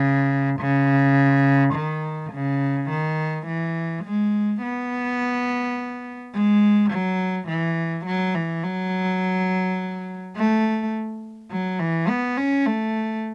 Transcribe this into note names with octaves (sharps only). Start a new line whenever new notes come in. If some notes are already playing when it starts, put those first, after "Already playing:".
Already playing: C#3
C#3
D#3
C#3
D#3
E3
G#3
B3
G#3
F#3
E3
F#3
E3
F#3
A3
F#3
E3
B3
C#4
A3